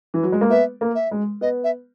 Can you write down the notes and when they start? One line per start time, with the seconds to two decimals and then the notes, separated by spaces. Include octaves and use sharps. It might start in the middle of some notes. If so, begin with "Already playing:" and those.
0.14 E3
0.23 F#3
0.32 G#3
0.41 A#3
0.50 B3 E5
0.81 A#3
0.95 E5
1.11 G#3
1.41 B3 D#5
1.64 E5